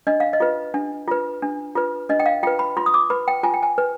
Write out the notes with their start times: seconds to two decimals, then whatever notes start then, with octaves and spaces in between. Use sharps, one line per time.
0.07 D4 D#5
0.20 F5
0.33 D#5
0.40 F4 B4
0.74 D4
1.08 F4 B4
1.42 D4
1.76 F4 B4
2.09 D4 D#5
2.19 G5
2.26 F5
2.43 F4 G5
2.47 B4
2.59 B5
2.77 F4 C6
2.86 D#6
2.94 D6
3.10 B4 B5
3.28 G5
3.43 F4 G#5
3.53 G5
3.63 G#5
3.78 B4